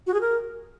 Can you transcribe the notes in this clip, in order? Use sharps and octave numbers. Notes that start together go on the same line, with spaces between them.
F#4
G#4
A#4